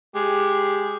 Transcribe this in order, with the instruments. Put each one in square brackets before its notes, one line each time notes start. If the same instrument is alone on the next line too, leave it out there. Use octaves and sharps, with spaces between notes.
[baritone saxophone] G#3 [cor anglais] G4